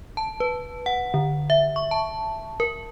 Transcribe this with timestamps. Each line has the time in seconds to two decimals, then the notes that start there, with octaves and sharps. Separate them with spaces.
0.17 A5
0.40 B4
0.86 F#5
1.14 D3
1.50 E5
1.76 C#6
1.91 A5
2.60 A#4